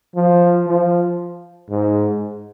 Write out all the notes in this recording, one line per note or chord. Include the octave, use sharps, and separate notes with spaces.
F3
F3
G#2